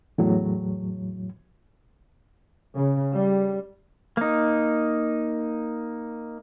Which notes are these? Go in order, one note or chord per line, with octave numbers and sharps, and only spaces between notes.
E2 A2 F#3
C#3
G3
A#3 D#4